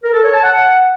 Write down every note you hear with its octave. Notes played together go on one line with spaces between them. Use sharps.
A#4
A4
C#5
A5
F#5